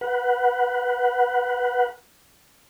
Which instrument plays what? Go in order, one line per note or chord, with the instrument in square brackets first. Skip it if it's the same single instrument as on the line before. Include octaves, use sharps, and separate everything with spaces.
[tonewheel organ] B4 F#5